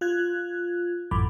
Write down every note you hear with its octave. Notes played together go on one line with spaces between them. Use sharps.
F4 F#6 G#6
A1 F#2 E3 B5 D6